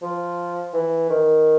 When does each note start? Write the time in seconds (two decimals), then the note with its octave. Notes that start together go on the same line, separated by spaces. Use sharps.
0.02 F3
0.73 E3
1.10 D#3